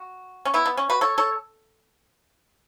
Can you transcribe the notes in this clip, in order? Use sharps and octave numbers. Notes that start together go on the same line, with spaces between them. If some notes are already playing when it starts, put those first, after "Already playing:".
Already playing: F#4
C#4
B3 E4
B3
C#4
F#4 B4
A4 C#5
A4 C#5